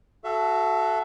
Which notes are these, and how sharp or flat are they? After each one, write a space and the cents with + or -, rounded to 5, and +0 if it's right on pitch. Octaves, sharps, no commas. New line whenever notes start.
F#4 +0 A4 -15 E5 +30